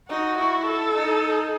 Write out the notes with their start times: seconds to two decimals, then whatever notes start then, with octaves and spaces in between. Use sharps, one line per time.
0.10 D#4 F#4
0.38 E4
0.67 A4
0.94 D#4